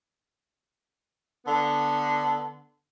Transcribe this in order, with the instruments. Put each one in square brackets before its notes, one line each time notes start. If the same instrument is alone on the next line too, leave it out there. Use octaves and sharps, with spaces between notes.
[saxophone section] D3 B3